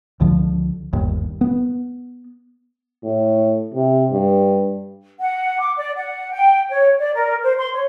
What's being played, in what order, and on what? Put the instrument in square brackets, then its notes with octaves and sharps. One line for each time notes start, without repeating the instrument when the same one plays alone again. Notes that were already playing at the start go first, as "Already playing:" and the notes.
[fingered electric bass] C#2 D3 F3
G1 D#2
B3
[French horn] A2
C3
G2
[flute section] F#5
D6
D5
F#5
G5
C#5
D5
A#4
C5
C6
C#5